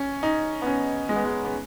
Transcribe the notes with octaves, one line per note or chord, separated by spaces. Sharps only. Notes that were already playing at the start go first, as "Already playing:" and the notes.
Already playing: C#4
D#4
B3
C#4
G#3
B3
G#3
B3